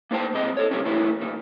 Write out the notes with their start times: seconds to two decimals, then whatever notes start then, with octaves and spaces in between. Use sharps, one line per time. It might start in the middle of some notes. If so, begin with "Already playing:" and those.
0.11 A#3 B3 D#4 C5 G5 A5
0.33 B1 C3 G#3 D#5
0.57 A4 C#5
0.71 C#3 G3 G#3 A#3 C4 C#4
0.85 A2 D#3 E3 A#3 C#4 E4
1.22 D#2 A#2 D#3